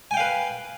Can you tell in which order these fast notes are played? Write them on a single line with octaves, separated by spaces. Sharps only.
G#5 G5 F5 B4